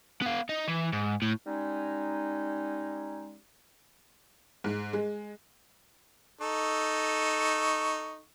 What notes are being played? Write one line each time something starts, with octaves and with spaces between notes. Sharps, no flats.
B3 F5
D#4
E3
G#2
A2
G3 G#3 C#4 D#4
G#2
G#3
D#4 A4 C#6